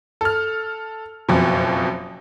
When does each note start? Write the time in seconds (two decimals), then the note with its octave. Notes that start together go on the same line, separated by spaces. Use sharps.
0.21 A4 F6
1.29 F#1 F2 B2